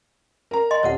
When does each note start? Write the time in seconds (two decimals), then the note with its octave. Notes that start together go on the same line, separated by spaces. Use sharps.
0.51 A#4 A#5
0.71 D#5 G#5 C6
0.83 D#1 F4 C#5 D#5 F#5